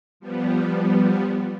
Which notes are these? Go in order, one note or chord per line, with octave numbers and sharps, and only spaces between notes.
F3 G3 B3